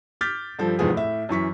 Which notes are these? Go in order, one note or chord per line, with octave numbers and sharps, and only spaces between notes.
D6 F6 G6 A6 B6
G2 F3 A4
F1 E2 G#2 F3 B3 G#4
A2 E5
F#2 E3 C#6 B6